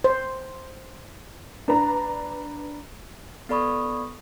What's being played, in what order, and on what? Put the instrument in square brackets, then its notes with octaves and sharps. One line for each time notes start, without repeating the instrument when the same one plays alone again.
[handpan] C5
[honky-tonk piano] D4 B4 A#5
[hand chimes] B3 A4 D5 B5 C#6 D#6